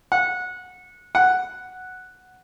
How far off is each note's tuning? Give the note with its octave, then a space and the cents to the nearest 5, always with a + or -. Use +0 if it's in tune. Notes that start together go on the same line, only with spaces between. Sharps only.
F#5 -20
F#5 +0